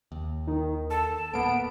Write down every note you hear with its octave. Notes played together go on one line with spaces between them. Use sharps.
D#2
D#3
A4 A5
D1 A#3 B3 D7